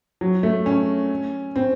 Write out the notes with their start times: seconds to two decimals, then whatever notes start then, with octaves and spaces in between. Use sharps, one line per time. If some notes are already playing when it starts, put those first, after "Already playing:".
0.21 F#3
0.43 A3
0.66 C#4
1.56 C4